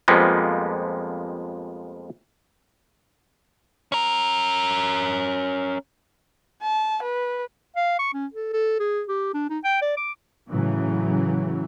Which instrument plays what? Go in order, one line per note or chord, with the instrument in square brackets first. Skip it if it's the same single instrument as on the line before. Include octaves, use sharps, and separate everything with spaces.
[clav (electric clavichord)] F2 F3 G3 G#3 A#3 B3
[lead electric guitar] C#4 A#4
[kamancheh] A5
B4
[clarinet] F5
C#6
C#4
A4
A4
G#4
G4
D4
D#4
G5
D5
D6
[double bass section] A2 C#3 E3 F#3